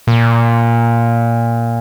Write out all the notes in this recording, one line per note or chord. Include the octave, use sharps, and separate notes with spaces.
A#2